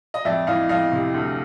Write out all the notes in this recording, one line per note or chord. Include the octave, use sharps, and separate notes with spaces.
D#5
F2 D5 E5
E3 D#5 F5
F2 D#5 F5
C3
D2